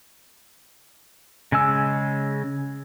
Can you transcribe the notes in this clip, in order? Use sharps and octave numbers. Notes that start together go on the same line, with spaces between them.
C#3 G#3 G#5 E6